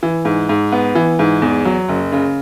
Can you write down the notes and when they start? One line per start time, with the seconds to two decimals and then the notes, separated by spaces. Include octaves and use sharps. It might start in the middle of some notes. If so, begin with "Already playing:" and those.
0.03 E3
0.25 G#2
0.49 G#2
0.72 B3
0.95 E3
1.19 G#2
1.42 E2
1.65 F#3
1.89 F#1
2.12 C#3